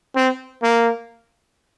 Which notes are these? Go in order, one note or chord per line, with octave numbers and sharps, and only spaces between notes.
C4
A#3